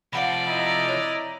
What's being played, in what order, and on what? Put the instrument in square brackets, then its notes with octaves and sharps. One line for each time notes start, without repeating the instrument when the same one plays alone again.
[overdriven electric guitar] C3 F3 [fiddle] D5 [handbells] F5 F#5 B5
[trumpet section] E4 D#5 A#5
[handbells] C#5